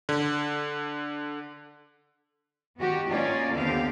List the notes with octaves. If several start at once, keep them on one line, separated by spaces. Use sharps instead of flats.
D3
D#3 B3 F#4 G4
A#3 C#4 D#4 F4 D5
D#2 D3 B3 C4 G4 F5